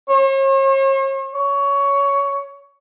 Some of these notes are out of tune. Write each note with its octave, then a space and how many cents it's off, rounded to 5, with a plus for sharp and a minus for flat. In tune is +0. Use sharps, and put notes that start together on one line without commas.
C#5 -45
C#5 +15